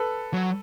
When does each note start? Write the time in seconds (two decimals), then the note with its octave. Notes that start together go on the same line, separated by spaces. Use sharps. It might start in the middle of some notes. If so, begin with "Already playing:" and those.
Already playing: A4 B4
0.34 F#3